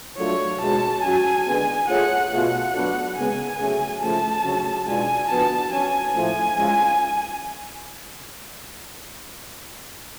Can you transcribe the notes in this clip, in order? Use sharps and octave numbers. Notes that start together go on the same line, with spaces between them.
F#3 A3 D4 F4 A4 C#5
B2 G#3 C#4 F#4 A5
F#3 C#4 F#4 G#5
D3 G#3 B3
A3 F4 G#4 C#5 F#5
B2 A3 F4 G#4 F#5
F#3 B3 D4 F#4 A4
C#3 G#3 B3 G#5
C#3 F#3 A3 C#4 G#4
C#3 F3 A3 F4 A5
C#3 F#3 C#4
B2 G#3 D4 F4 G#5
D3 F3 B3 F#4 A5
F#3 C#4 F#4 G#5
A2 F3 A3 G#5
G#3 C#4 F4